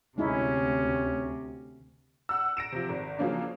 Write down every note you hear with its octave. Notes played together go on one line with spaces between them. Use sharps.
D2 C3 G#3 C#4 D#4 E4
F#5 E6
A#6 D7 E7
C3 F3
G#1
C#3 F3 F#3 A#3 C#4 D4